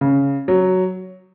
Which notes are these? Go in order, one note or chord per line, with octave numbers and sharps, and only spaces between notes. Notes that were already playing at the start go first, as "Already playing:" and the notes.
C#3
F#3